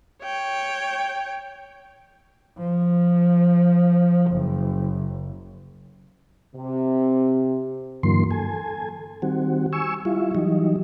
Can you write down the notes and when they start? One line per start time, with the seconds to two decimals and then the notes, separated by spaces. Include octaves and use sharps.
0.22 C#5 G5
2.58 F3
4.31 F#1
6.55 C3
8.03 G2 D3 E3 F#3 A#3 C6
8.31 A4 G#5
9.22 D#3 G3 C4 F#4
9.73 G#5 C#6 E6
10.05 G3 E4 F4
10.35 E3 F#3 G3 D#4